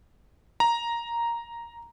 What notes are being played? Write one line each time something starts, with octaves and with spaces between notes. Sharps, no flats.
A#5